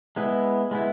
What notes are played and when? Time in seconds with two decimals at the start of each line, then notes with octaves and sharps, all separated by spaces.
0.16 G#3 B3 E4
0.71 G#3 B3 E4